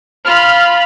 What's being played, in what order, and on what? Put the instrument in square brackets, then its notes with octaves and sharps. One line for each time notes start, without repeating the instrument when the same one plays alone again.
[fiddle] F4 B5 [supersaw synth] F6